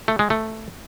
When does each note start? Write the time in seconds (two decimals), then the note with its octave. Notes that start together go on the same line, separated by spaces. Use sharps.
0.08 A3
0.19 G#3
0.30 A3